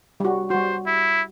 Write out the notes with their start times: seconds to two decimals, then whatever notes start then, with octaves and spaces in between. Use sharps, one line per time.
0.20 G3 F#4
0.50 G3 F#4 C5
0.87 E4